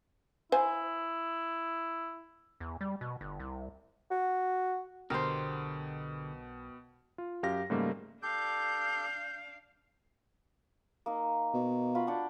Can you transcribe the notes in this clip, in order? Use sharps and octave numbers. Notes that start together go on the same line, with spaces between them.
E4 C5 G#5
E2
G3
B2
G1
C2
F#4
B1 B2 D3 B3 G4 A#4 C5 G5
F4
F#2 G4 F5 A#6
G#2 C#3 G3 A3 A#3
D4 G4 A4 F5 G6
A#3 D#4
B2
F4 F#4 B5
D4 F#5 G5